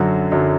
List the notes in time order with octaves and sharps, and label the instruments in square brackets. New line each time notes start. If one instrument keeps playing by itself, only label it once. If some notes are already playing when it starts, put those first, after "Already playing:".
Already playing: [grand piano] F#2 D3 F#3 F#4
F#2 D3 F#3